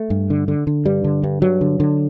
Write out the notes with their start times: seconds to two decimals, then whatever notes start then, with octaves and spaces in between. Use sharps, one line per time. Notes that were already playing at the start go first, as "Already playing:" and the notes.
Already playing: A3
0.10 G2
0.30 D3
0.48 D3
0.67 D3
0.86 G2 G3
1.04 D3
1.24 G2
1.42 G2 F#3
1.61 D3
1.80 D3